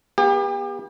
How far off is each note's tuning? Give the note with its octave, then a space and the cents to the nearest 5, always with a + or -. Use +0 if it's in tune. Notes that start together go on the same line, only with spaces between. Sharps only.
B3 -35 G4 +35